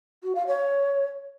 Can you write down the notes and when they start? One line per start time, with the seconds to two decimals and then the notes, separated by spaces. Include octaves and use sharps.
0.23 F#4
0.35 F5
0.47 C#5